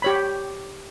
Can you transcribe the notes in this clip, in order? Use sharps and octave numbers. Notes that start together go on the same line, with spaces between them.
G4 C#5 B5